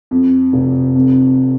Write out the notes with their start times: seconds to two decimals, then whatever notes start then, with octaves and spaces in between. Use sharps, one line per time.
0.11 F2
0.53 F1
0.95 F2